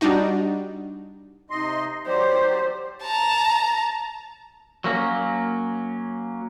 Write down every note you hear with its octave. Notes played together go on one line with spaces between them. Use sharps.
G3 D4 D#4 F#4
C3 D#4 D#5 C6
F#3 G4 C5 D5
A5 A#5
F#3 A#3 C#4